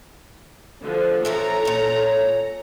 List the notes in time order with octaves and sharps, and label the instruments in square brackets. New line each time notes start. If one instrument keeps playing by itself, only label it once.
[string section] D3 F3
[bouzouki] E3 F3 C#4 [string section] A4 A#5
[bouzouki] A#2 C#4